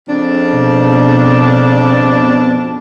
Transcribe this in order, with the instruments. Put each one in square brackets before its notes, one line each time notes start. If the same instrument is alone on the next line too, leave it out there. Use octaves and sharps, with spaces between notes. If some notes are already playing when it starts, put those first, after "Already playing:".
[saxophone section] F2 C#3 D4
[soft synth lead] B2